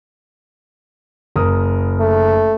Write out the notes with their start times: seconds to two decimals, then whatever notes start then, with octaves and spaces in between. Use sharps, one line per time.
1.36 F#1 A#4 D#6
2.00 A3